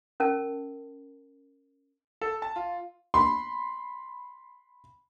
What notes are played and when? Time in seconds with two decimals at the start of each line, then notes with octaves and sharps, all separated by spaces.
0.20 C#4 A#4 A5
2.22 A4
2.42 A5
2.56 F4
3.14 B5 C6